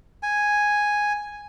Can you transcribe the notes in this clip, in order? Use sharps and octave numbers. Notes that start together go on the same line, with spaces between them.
G#5